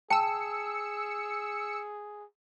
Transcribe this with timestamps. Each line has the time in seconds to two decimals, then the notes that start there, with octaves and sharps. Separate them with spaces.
0.10 G#4 G5 A5 E6 C#7